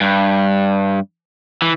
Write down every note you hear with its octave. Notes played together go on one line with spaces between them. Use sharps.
G2
E3